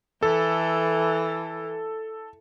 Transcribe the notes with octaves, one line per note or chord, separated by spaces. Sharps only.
E3 A4